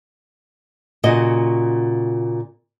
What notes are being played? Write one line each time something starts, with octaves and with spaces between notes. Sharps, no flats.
A#2 C#3 F#4 D#5